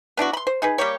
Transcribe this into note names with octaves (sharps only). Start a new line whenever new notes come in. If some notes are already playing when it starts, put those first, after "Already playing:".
B3 D4 E4 F#4
B5 C6
C5
D#4 G#4 B4
G3 A#3 G4 C#5